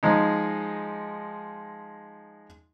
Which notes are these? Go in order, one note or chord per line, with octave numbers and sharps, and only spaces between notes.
F3 G#3 D#4